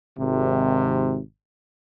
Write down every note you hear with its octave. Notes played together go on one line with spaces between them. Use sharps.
G#1 C3